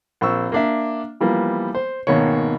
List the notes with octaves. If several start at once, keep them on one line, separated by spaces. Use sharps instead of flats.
A#1 C4 C#6 E6
A#3 D4 E5
E3 F3 G3 A#3 B3
C5
G#1 B2 D#3 A#3 C#5